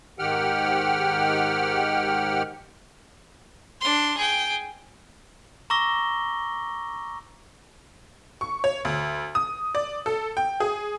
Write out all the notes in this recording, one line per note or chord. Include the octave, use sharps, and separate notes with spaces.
G#2 D#3 G4 F#5 G5 F6
D4 C6
G#4 G5
A#5 C#6 D6 E6 A#6 G7
C#6
C#5
D2
D#6
D5
A4
G5
G#4